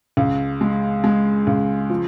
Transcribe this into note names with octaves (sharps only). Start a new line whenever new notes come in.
C#2
G#3
G#3
C#2
F3